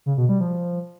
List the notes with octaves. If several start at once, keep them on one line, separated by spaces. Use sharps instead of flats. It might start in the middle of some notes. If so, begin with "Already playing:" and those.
C#3
B2
G3
F3